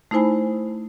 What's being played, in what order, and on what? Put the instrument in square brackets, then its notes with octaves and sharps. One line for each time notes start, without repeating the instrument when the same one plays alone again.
[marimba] A3 D#4 E4 C5 G#5 B5